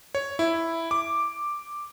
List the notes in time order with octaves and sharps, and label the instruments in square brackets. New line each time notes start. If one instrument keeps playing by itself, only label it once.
[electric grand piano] C#5
E4
D6